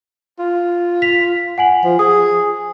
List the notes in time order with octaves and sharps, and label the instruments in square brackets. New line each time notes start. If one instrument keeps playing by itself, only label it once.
[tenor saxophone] F4
[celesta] B6 F7
F#5 G#5 F#7
[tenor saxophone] F3
[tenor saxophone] G#4 [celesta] D#6